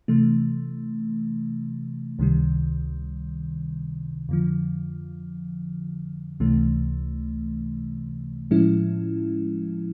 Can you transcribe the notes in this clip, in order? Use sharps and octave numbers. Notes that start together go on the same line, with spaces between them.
C3 E3 A3
C#2 C3 D#3 G3
F2 D3 F3
C#2 C3 E3 A3
A2 F3 G#3 C#4 E4